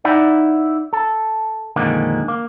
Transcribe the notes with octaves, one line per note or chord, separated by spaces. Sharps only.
D#4 E4 D5 F#5
A4
F2 A#2 D3 D#3 G#3 A#3
A#3